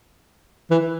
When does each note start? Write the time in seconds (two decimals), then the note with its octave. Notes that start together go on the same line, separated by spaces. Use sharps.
0.71 E3